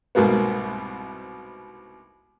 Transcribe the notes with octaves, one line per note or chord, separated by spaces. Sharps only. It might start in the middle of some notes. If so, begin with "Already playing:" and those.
C2 G#2 B2 A#3 B3